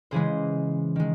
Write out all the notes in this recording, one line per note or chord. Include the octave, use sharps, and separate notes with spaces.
C#3 E3 G#3 G#4 C5
D#3 G#3